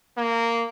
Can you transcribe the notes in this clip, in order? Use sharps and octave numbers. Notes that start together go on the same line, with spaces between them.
A#3